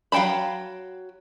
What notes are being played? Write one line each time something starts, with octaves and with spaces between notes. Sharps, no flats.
F#3 F5 G5 A5 B5